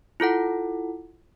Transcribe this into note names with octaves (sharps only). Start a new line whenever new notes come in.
E4 F4 A4 F#5